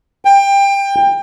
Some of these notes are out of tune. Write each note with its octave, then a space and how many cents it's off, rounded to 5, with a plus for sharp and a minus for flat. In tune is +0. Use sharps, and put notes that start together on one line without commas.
G5 +25